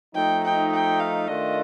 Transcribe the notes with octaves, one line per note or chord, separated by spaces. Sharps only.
F3 A3 D#4 G5
G5
G5
F5
D#3 A3 D4 F4 D#5